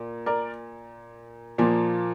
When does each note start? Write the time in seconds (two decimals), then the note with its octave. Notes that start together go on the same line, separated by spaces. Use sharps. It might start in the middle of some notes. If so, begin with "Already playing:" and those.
Already playing: A#2
0.26 A#4 D5
1.58 A#2 F3 A#3